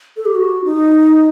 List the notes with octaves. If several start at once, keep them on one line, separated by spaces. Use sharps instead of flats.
A4
G4
F#4
D#4